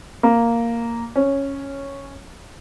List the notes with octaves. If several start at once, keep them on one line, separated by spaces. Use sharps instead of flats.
A#3
C#4